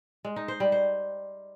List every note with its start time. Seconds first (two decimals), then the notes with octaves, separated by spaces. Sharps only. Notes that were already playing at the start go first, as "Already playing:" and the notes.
0.24 G#3
0.36 D#4
0.48 C5
0.60 G3
0.72 C5